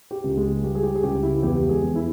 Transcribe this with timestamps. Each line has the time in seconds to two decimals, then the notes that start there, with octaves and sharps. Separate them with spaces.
0.11 G4
0.24 C#2
0.37 G#3 G#4
0.63 G3 G4
0.75 G#4
0.83 G4
0.95 G#4
1.03 C#2 G4
1.23 E4
1.43 E2 G4
1.69 G#3 G#4
1.82 E2
1.95 E4